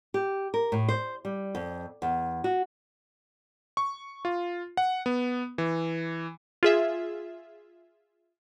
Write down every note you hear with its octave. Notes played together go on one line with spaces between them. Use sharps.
G4
A#4
A2
C5
G3
F2
E2
F#4
C#6
F4
F#5
B3
E3
F4 G#4 E5